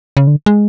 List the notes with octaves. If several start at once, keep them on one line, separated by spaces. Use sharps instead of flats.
C#3
D3
G#3